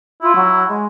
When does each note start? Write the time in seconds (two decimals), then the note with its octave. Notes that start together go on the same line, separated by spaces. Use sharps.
0.22 E4 F4
0.35 F#3
0.68 G#3